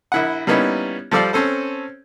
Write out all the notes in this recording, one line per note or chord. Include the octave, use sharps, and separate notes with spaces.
A#1 E4 F#5
G3 A#3 B3 C#4 D#4 E4
F3 G3 A4 D5 F5
C4 C#4 A4 C5